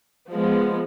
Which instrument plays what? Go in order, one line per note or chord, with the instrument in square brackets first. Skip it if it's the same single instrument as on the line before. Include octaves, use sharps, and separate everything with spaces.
[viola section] F3 G#3 B3